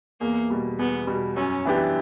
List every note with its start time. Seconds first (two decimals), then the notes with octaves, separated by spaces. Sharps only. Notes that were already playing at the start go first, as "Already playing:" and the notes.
0.21 E2 A#3
0.50 B2 G3
0.79 E2 B3
1.07 B2 G3
1.37 F#2 C#4
1.65 E3 B3 D4 G4